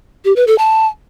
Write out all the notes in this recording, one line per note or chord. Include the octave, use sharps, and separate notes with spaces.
G4
B4
A4
A5